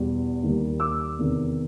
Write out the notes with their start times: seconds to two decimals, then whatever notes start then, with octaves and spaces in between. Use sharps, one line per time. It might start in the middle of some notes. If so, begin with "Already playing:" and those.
Already playing: E2 B2 G3 B3
0.42 D#2 D#3 G3
0.80 D6 E6
1.19 E2 C3 D#3